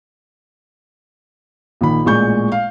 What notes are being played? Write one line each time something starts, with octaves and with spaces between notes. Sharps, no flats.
A#1 D#3 B5
A1 A#2 G#3 C#6 G6
F5